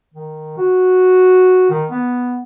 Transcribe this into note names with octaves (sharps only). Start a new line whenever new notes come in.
D#3
F#4
D#3
B3